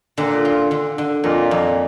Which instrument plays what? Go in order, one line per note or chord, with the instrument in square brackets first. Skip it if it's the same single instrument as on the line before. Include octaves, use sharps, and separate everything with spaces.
[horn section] A#2 [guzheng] D3
[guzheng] F4
D3
D3
[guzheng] F2 [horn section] A#2
[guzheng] F2